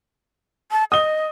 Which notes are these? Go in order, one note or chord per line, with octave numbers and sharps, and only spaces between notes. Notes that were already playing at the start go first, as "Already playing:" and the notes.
A5
D#5 D#6 G7